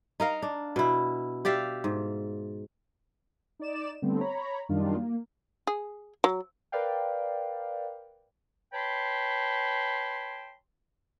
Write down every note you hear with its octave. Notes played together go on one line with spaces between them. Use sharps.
D#4 A#4 F5
D4
B2 E4
G4 D5 E5 F5
G#2
D#4 D5 E7
D3 G3 A3 B3 C4
C#5 A#5 B5
F#2 D#3 G3 D4 D#4 F4
A#3
G#4
F#3
A#4 B4 D5 F5 G5
B4 C#5 G5 A5 B5 C6